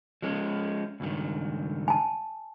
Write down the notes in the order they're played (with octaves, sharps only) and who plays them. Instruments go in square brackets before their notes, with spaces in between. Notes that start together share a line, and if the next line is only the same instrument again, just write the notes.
[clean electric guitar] F3 G#3 C#4
C#2 G2 D#3
[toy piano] G#5 A5